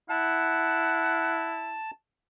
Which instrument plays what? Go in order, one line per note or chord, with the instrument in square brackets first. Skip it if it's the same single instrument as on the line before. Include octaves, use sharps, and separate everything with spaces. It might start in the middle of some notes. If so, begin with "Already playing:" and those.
[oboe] E4 [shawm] F#5 [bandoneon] A5